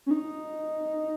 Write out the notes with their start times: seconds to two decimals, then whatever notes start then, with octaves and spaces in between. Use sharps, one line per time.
0.06 C#4
0.11 D#4